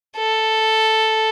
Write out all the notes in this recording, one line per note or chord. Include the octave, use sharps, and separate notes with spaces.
A4